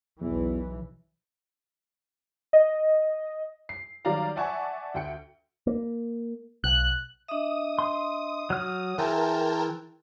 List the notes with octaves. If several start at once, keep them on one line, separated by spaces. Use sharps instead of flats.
B1 E2 E3
D#5
C7
D#3 F#3 G3 D5 F5 A#5
D5 E5 F#5 G#5 A5 C#6
D2 G5 C#7
A#3
B1 F#6
D4 D#5 E5 D#6
C6
F#3 F6
E3 G#4 A#4 G5 A5 C6